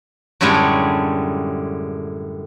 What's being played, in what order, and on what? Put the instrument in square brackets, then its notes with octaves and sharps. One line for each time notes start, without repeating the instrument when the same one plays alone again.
[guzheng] F#2 A2 D3 G3 G#3 C#5